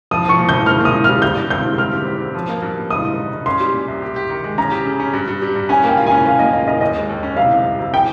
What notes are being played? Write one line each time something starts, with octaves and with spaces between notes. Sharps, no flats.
F3 D#6
F3 C#6
A#2
F3 G6
A#3 F6
A#2
D#6
A#2
G3 F6
G3 G6
G2
C4 G6
G2
C4 F6
G4
G4
C4
F3
A#3
G2
G2
D#4 D#6
D#4
D#4
D#4
C#4 C6
G3
A#2
C2
G4
G4
D#3
G#3
C#4 A#5
G4
C#3
C#4
G2
G2
G3
G2
C#4 G#5
A#3 G5
F4
C#4 G#5
A#3 F5
A#3 D#5
F4 D#5
A#4 D#5
D#2 D#5
G#3
D#2
C#4
C3 F5
C2
C2
C3
G#4 G5